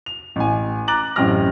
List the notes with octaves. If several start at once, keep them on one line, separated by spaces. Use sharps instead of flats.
F7
A1 G#5
A#5 D6 F#6 A6 F#7
A1 F#2 C4 G4 F6 A#6